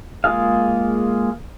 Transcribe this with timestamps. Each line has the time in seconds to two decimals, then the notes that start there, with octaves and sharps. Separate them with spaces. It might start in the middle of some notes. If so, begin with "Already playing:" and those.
0.24 G#3 A#3 F4 G#4 F5